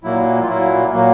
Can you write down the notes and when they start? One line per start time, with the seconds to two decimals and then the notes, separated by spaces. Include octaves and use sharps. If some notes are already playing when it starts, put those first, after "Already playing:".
0.04 A#2 F#3 A#3 E4
0.43 F4
0.48 A#2 F#3 A#3 E4
0.92 A#2 F#3 A#3